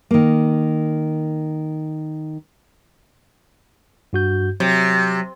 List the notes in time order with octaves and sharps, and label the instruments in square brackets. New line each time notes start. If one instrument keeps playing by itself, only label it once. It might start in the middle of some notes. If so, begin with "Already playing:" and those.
[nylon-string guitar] D#3 A#3
[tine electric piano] G2 F#4 G6
[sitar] C3 [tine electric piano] F#3